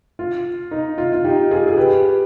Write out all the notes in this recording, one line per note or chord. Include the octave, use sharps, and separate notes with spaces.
F4
D#4
F4
F4
D#4 G4
F4 G#4
G#4
G4 B4